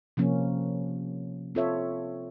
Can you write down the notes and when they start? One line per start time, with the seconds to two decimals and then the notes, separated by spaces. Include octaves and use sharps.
0.17 C3 F3 A#3 C#4
1.55 C4 F4 A4 C#5 E5